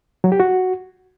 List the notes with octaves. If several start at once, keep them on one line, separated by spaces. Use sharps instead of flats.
F#3
G4
F#4